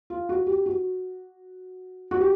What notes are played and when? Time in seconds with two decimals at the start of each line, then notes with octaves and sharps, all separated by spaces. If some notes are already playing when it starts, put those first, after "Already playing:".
0.10 F4
0.29 F#4
0.46 G4
0.66 F#4
2.11 F#4
2.21 G4